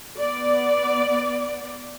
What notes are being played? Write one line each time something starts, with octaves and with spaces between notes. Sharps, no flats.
B3 D5